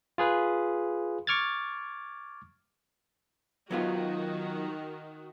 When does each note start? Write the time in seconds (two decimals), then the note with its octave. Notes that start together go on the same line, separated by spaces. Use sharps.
0.18 F4 G#4 B4
1.27 C#6 D6 F6 G#6 A6
3.71 D#3 F#3 B3 F4 F#4